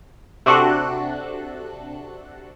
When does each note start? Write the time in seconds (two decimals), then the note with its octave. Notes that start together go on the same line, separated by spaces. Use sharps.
0.46 C3 D4 F#4 A4 F#6